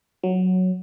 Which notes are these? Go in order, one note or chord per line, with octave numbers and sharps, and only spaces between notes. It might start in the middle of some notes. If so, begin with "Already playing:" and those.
F#3